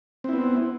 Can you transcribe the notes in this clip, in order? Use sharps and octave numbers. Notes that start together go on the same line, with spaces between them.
B3 C4 E4